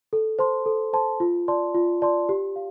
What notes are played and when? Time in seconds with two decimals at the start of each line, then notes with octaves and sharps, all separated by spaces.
0.13 A4
0.39 C5 A5 C6
0.66 A4
0.93 C5 A5 C6
1.20 F4
1.48 D5 A5 C6
1.74 F4
2.02 D5 A5 C6
2.29 G4
2.56 F5